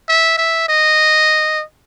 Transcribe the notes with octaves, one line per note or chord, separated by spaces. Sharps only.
E5
E5
D#5